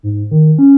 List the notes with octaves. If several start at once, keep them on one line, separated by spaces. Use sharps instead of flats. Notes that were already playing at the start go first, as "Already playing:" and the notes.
G#2
D#3
C#4